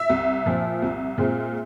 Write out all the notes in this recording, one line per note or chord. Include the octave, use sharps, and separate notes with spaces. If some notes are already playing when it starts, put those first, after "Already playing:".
Already playing: E5
C2
A#2 F3
C2
A#2 G#3 C4